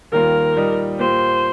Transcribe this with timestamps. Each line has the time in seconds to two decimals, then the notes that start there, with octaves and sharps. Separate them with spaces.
0.12 D#2 D#3 G3 A#3 F4 A#4
0.56 A#2 G3 D#4
0.99 A#2 A#3 G4 C5